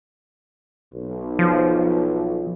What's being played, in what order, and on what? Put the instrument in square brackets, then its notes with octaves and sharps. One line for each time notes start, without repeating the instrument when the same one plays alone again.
[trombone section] B1
[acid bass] F3